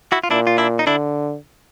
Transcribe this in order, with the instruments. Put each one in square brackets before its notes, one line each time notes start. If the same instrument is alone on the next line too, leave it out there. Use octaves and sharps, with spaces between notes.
[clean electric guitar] E4 F#4
F4
[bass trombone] A#2 [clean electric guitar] D4 E4
[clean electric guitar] F4
D4 E4
D#4
[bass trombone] D3 [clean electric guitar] D4 E4